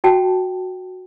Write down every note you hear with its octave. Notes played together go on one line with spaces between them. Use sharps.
F#4 G5 A5